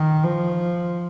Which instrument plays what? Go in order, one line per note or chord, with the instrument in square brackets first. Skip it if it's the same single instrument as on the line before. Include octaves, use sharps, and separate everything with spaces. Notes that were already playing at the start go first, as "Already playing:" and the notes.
Already playing: [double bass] D#3
F3